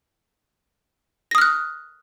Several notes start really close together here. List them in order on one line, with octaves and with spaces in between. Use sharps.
A#6 D#6 F6 F#6